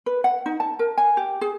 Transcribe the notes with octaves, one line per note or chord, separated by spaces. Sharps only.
B4
F#5
D#4
A5
A#4
G#5
G4
G#4